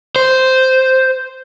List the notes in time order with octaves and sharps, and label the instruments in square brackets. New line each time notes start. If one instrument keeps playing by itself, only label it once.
[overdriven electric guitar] C5